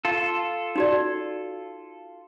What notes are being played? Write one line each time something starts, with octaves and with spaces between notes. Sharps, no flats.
F4 A4
D#4 F#4 D5